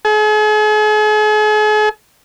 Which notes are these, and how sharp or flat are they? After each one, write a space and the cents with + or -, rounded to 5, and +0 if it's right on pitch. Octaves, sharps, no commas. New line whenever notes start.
G#4 +40